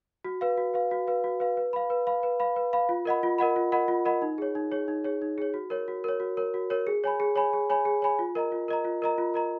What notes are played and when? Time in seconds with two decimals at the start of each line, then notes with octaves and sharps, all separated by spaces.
0.24 F#4
0.41 B4 F5
0.57 F#4
0.74 B4 F5
0.91 F#4
1.07 B4 F5
1.24 F#4
1.40 B4 F5
1.57 B4
1.73 F5 B5
1.90 B4
2.07 F5 B5
2.23 B4
2.40 F5 B5
2.56 B4
2.73 F5 B5
2.89 F4
3.05 A#4 D#5 F#5 B5
3.23 F4
3.38 A#4 D#5 F#5 B5
3.56 F4
3.72 A#4 D#5 F#5 B5
3.88 F4
4.05 A#4 D#5 F#5 B5
4.22 D#4
4.38 G#4 C#5
4.55 D#4
4.72 G#4 C#5
4.88 D#4
5.04 G#4 C#5
5.22 D#4
5.38 G#4 C#5
5.54 F#4
5.70 A#4 C#5
5.88 F#4
6.04 A#4 C#5
6.20 F#4
6.37 A#4 C#5
6.54 F#4
6.70 A#4 C#5
6.87 G#4
7.04 C#5 G#5 B5
7.20 G#4
7.36 C#5 G#5 B5
7.53 G#4
7.70 C#5 G#5 B5
7.85 G#4
8.02 C#5 G#5 B5
8.19 F4
8.35 A#4 D#5 A#5
8.52 F4
8.68 A#4 D#5 A#5
8.84 F4
9.02 A#4 D#5 A#5
9.18 F4
9.34 A#4 D#5 A#5